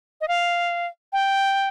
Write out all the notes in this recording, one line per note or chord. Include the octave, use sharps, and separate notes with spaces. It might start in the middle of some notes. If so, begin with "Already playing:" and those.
D#5
F5
G5